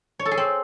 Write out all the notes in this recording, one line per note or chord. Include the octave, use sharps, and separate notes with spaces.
C#5
A4
G#4
C4